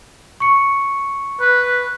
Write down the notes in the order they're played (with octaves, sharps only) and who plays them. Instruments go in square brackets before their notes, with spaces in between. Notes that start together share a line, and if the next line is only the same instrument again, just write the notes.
[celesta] C#6 C#7
[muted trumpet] B4